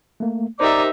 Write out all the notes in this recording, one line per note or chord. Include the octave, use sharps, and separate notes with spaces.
A3 A#3
D#4 G4 A#4 C5 D5 E5 A#5 D6